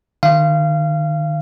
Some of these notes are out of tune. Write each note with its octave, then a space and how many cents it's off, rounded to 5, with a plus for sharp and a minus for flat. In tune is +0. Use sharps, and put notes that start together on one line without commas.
D#3 -30 F5 -25